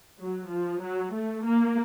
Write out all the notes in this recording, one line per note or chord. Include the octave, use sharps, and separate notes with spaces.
F#3
F3
F#3
A3
A#3